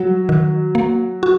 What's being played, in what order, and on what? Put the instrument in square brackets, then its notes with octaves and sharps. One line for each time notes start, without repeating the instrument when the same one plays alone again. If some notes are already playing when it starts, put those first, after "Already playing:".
Already playing: [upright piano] F#3 [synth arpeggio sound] G3
[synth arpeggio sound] D#3
A#3
F#4